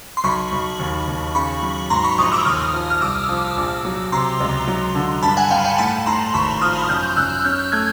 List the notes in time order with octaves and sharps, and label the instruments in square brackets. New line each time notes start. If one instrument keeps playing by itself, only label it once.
[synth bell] C6
[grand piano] B1 [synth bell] B5 C#6
[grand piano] B1
D#2
D#2
[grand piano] C#3 [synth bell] B5 C#6
[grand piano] F#3
[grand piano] G#2 [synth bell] A#5 C6
[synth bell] B5 C#6
[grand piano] A#1 [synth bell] C#6 D#6
[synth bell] D6 E6
[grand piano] D#2 [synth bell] D#6 F6
[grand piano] F3
[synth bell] F6
[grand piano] C2 [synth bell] D6 E6
[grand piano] F3
A#1
F#3
[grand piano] C3 [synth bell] A#5 C6
[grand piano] C#2
F#3
D3
[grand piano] G2 [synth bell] A5 B5
[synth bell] F#5 G#5
[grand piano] G2 [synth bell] F5 G5
[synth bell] F5 G5
[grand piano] A2 [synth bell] A5 B5
[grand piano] A2 [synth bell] A#5 C6
[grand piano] G#1 [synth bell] B5 C#6
[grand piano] F3 [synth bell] D#6 F6
[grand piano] F#2 [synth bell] F6 G6
[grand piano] F#2 [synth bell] E6 F#6
[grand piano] C#4 [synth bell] F6 G6
[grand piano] A3 [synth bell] F#6 G#6